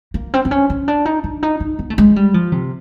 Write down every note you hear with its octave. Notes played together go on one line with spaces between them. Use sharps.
A#3
C4
C4
C#4
C#4
D4
D#4
D4
D#4
D#4
B3
A3
G#3
G3
F3
C3